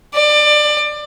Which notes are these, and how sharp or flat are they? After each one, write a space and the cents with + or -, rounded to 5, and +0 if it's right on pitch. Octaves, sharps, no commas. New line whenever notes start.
D5 +25